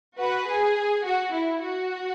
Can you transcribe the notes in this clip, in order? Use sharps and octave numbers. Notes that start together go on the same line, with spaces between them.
F#4 B4
G#4
F#4
E4
F#4